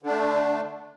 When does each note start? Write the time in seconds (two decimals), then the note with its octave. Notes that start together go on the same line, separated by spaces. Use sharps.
0.03 D3
0.06 D4
0.10 A3